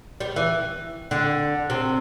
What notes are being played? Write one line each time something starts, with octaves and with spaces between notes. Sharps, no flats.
G3
E3
D3
C3